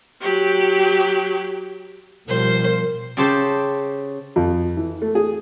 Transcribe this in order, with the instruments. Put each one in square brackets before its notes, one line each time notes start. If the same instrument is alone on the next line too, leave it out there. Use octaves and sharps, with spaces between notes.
[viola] F#3 G4
[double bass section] B2 F3 G3 [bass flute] A#4 [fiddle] C5
[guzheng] C#3 G4 A4 C5 A5
[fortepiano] F2
E3
A3
G#4